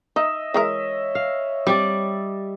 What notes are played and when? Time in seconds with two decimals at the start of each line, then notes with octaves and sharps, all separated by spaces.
0.16 D#4 D#5 E5
0.54 E3 G#3 A#4 C#5 D#5 E5
1.15 F5
1.67 G3 C4 G4 D5